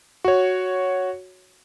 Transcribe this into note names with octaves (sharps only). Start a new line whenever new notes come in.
F#4 C#5